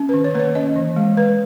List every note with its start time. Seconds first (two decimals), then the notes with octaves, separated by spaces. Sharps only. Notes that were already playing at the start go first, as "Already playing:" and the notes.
Already playing: C#4
0.09 D#3 B4
0.24 C#5
0.35 A#3 B4
0.40 C#5
0.55 C#4 D#5
0.76 E3
0.96 G#3
1.17 G#3 B4